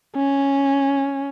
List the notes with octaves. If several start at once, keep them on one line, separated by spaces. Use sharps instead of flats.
C#4